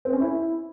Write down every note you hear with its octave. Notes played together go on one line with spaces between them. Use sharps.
C4
C#4
E4